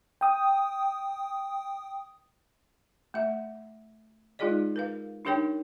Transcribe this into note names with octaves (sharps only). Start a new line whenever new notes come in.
G5 D#6
A3 E5
G#3 D#4 F4 G#4 D5 D#5
A#4 B4 F5
D4 D#4 G4 A#4 C#5 G5